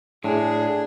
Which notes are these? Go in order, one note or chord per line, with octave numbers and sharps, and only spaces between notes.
A2 D4 G#4